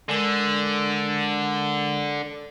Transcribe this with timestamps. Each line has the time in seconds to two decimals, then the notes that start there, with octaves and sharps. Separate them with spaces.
0.09 D3 G#3 A#4 E6